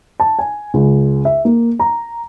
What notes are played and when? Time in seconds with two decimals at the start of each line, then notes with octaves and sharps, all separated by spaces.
0.20 A5
0.39 G#5
0.74 C#2
1.25 E5
1.45 A#3
1.80 A#5